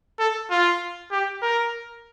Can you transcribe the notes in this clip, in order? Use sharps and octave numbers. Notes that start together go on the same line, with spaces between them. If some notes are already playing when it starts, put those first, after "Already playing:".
A4
F4
G4
A#4